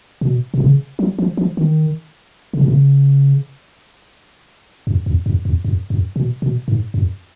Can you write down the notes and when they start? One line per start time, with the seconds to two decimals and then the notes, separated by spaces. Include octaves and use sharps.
0.21 B2
0.54 B2
0.60 C#3
0.99 F#3
1.19 F3
1.37 F3
1.57 D#3
2.53 C#3
2.61 B2
2.68 C#3
4.87 F#2
5.06 F2
5.26 F#2
5.45 F2
5.65 F#2
5.90 F#2
6.16 B2
6.42 B2
6.68 G#2
6.94 F#2